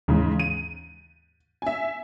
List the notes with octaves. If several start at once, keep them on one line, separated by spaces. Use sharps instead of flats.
D#2 G#2 C#3 E3
D#7
E5 G#5